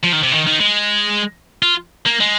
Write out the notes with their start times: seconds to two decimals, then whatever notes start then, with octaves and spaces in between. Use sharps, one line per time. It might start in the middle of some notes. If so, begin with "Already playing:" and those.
0.03 F3
0.12 D#3
0.23 C3
0.32 D#3
0.47 D#3
0.61 G#3
1.62 F4
2.06 A#3
2.20 G#3